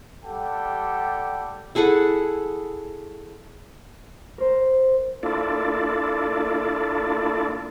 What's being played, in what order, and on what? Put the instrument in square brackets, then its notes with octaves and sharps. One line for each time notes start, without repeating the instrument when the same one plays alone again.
[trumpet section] G3 G4 A4 F#5 G5
[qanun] E4 G#4 A4 F#5
[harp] A#4 C5
[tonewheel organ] A#3 D4 E4 F4 A4 D5